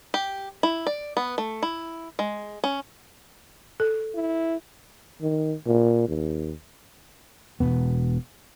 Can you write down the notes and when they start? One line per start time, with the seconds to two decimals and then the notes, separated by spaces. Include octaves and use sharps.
0.14 G4
0.63 E4
0.87 D5
1.17 B3
1.38 A3
1.63 E4
2.19 G#3
2.64 C#4
3.80 A4
4.15 E4
5.22 D#3
5.67 A#2
6.08 D#2
7.60 E1 F2 B2 B3